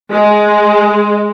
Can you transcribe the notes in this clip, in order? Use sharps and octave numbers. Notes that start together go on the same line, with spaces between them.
G#3